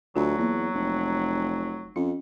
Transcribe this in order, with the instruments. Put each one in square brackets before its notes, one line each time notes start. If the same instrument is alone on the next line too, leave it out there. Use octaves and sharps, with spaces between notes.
[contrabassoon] D2 [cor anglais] F#3 [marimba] F4
[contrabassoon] E2 [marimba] A#3
[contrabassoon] F1
[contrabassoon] F2 [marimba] C#4